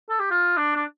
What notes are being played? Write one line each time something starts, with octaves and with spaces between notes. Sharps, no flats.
A4
G4
F4
D4
D4